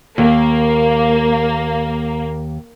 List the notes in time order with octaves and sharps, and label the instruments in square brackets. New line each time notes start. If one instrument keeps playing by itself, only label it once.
[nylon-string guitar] D#2 [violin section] A#3